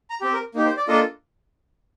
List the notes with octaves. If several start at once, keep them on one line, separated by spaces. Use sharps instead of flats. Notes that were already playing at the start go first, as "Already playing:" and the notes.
A#5
C4 G4
A#4
A#3 D#4 G4
C5
D5
A#3 D4 F4 A4 D#5